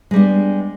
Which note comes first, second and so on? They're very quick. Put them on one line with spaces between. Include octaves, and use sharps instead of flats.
G#3 G3 D4 B3